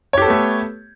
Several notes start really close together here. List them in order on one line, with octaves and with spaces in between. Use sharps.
C#5 G4 A4 B3 A3